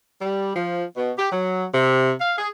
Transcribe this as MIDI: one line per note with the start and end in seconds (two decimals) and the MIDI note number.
0.22 0.55 55
0.56 0.84 53
0.97 1.12 47
1.18 1.29 67
1.31 1.65 54
1.74 2.12 48
2.20 2.32 77
2.38 2.47 68